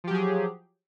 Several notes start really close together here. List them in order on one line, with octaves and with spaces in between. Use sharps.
F3 G4 F#3 G#4